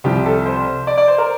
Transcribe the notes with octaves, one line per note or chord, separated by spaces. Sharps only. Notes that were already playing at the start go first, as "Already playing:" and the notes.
C2 C3 F3 G4
A4
C5
D5
D5
C5
A#4